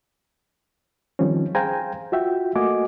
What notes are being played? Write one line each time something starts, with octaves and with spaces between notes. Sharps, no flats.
D#3 F3 G3 C4 C#4
G#4 C5 F5 G5 G#5 A#5
F4 F#4 E5 G5
A3 A#3 F#4 D#5 G#5 D6